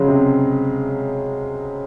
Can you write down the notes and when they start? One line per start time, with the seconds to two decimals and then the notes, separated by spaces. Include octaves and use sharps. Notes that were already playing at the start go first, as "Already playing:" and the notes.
Already playing: C#3 F#3 G#3
0.08 C3